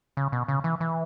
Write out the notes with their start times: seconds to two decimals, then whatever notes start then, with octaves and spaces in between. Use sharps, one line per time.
0.17 C#3
0.32 B2
0.48 C#3
0.64 E3
0.80 E3